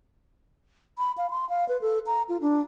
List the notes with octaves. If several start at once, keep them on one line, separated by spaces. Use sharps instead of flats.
B5
F5
C6
F5
B4
A4
A#5
F4
D4